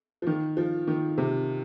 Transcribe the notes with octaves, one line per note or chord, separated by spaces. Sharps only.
F3
D#3
F3
D#3
C3